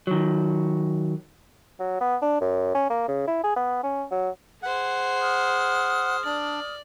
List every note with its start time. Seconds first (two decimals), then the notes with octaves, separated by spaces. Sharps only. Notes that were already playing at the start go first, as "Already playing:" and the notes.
0.07 D#3 F#3
1.80 F#3
2.00 B3
2.22 D4
2.41 F#2
2.74 C#4
2.90 A#3
3.08 C#3
3.27 E4
3.43 G#4
3.56 B3
3.84 C#4
4.11 F#3
4.63 G#4 C5 F#5
5.20 D#6 F6
6.25 D4 D5